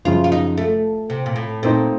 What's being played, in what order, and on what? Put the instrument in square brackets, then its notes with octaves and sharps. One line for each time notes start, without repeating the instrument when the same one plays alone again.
[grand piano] F#2 C#3 F3 [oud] F4
[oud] F4
D#4
A3
C3
A#2
A2
[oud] A#2 [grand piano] A3 C4 D#4